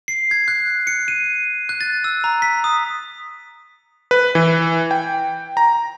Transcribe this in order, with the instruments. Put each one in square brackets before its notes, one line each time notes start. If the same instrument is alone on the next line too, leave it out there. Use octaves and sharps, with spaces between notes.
[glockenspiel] C7
G#6
F#6
C#7
D#7
F#6
A6
E6
A#5
B6
D#6
[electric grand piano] B4
E3
G5
A#5